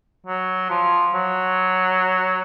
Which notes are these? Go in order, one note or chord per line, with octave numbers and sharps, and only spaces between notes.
F#3
F3
F#3